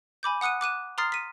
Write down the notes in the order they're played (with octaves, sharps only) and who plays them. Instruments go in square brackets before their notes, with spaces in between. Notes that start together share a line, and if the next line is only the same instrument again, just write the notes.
[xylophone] G#5 B5 D6 G6
F#5 D#6 F#6 C#7 D#7
D6 F#6 D#7 E7
A#5 C6 D#6 F6 A6 C7
B6 D#7